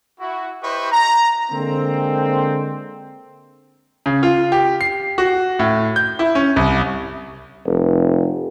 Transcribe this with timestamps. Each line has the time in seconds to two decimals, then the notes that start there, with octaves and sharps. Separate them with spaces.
0.20 E4 F#4
0.62 E4 G4 B4 C5 D#5 C#6
0.92 A#5
1.51 D3 G#3 A#3 C4
4.06 C#3
4.23 F4
4.52 G4
4.81 C7
5.18 F#4
5.59 A2
5.96 G6
6.19 E4
6.35 C#4
6.56 C2
7.66 F1